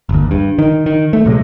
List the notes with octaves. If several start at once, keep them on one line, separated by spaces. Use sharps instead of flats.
G1 D#2
G2
D#3
D#3
A3
A2 C3 F#3 G#3